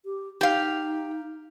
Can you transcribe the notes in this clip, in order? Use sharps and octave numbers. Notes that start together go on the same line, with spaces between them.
G4
D#4 G4 F5